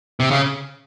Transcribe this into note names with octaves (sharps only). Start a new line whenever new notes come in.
C3
C#3